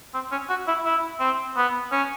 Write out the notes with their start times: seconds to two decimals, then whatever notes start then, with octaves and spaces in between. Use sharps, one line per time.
0.14 C4
0.32 C#4
0.49 F#4
0.68 E4
0.85 E4
1.20 C4
1.57 B3
1.92 C#4